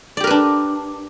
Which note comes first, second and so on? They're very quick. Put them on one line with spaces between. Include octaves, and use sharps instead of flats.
D5 G4 A#4 B4 D4